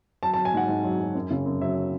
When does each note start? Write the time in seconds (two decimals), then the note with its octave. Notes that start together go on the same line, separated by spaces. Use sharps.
0.23 F#3 A5
0.34 A5
0.38 F#3
0.45 G#5
0.53 G#2 F#5
0.69 G#2
0.84 F#3
1.00 F#3
1.15 F#2
1.31 C#3
1.46 F#2
1.61 F#3 E5